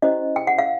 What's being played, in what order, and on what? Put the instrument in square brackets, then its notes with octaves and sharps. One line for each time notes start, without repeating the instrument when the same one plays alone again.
[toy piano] C#4 E4 G4 C5 D#5
G5
F#5
F5